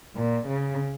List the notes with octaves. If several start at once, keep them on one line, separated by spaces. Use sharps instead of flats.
A#2
C#3